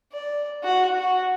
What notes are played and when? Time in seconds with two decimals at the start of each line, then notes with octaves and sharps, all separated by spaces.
0.13 D5
0.64 F#4
0.97 F#4